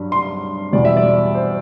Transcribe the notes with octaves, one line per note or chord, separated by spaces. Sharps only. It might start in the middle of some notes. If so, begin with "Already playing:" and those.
Already playing: G2 F#3
C6
E2 B2 G3 D5
E5
D5
C5